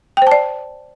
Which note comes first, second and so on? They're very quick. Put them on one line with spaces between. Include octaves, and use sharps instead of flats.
G5 C5 A5 D5